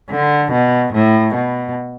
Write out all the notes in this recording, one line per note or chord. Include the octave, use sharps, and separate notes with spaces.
D3
B2
A2
B2